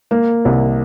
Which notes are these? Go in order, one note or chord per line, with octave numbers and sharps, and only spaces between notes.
A#3
C2